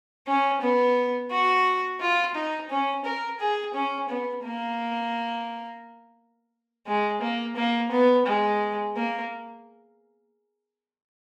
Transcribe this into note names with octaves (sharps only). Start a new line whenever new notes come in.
C#4
B3
F#4
F4
D#4
C#4
A#4
G#4
C#4
B3
A#3
G#3
A#3
A#3
B3
G#3
A#3